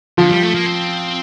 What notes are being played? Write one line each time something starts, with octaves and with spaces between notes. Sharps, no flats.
D3 F3
G3
A3
A#3
C4